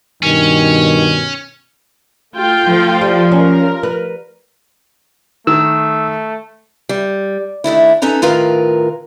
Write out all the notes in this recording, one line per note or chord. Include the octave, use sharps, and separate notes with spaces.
G2 B2 D#3 C#4
A3 F4 G5
F3
G3
C#4 A#4
B4
D#3 A3 E6
G3
D#3 A3 D4 E4
C#4 D#4 A4 B4 A#5
A2 D#3 F4 A#4 B4 F5